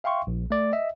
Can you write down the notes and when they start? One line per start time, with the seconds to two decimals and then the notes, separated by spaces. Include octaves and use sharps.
0.04 E5 F5 G5 C6 C#6
0.27 A#1
0.51 A3 D5
0.73 D#5 E5